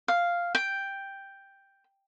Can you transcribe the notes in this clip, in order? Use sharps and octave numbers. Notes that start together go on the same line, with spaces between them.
F5
G5